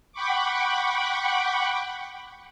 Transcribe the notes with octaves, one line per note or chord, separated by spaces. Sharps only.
F#5 G5 B5 C#6 D6